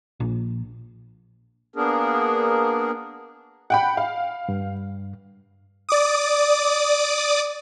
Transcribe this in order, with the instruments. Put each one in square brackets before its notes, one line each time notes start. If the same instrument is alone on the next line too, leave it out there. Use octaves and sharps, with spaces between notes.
[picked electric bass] A#1
[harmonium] A#3 B3 D4 G#4 A#4
[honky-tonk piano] F#5 G5 B5
F5
[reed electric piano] G2
[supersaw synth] D5 D6 D#6